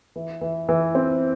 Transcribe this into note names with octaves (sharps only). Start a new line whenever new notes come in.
E3
E3
E3
C4